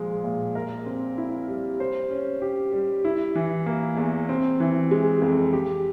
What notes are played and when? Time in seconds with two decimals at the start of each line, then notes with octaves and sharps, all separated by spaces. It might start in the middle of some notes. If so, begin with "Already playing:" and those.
Already playing: A#2 F3 G#3
0.24 A#2
0.55 A#4
0.86 C4
1.18 E4
1.48 G3
1.80 C5
2.10 C#4
2.42 G4
2.72 G3
3.05 E4
3.35 E3
3.66 A#3
3.97 E2
4.29 C4
4.60 E3
4.91 G#3
5.22 F2
5.53 G4